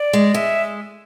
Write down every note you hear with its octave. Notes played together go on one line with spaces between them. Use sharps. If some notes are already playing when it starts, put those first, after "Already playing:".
Already playing: D5
G#3
G#3 E5